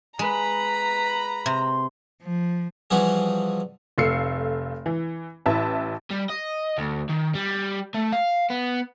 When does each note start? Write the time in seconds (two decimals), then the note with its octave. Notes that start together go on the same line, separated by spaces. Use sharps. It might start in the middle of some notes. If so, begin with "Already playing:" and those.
0.19 G#3 B4 A#5 B5
1.46 C3 C6
2.23 F3
2.91 E3 F3 G3 F#4 G#4
3.98 F1 A3 F5 E6 C7 C#7
4.86 E3
5.46 A1 E4 B4 E5 A5
6.11 G3
6.30 D#5
6.78 D2
7.09 D#3
7.35 G3
7.94 A3
8.12 F5
8.50 B3